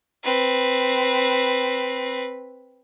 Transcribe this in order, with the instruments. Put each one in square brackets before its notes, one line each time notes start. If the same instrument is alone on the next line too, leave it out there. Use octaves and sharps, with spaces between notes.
[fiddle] C4 B4